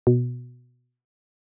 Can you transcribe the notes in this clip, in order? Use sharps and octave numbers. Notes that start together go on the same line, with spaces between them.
B2